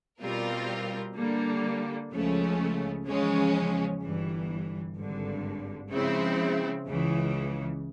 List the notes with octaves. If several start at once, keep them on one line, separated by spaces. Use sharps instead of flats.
B2 G3 C4 F4 A#4
D3 G3 A#3
C#2 C#3 F3 A3 C#4
E2 C#3 F3 G#3 C#4
G1 G2 E3
G#1 G2 D3
C#3 F3 G#3 C4 E4
C#2 C#3 E3